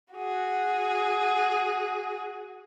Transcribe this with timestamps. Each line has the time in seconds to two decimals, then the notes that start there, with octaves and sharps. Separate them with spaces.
0.13 F#4 G#4